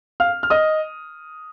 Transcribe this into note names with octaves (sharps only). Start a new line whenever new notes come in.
F5 F6
F6
D#5 D#6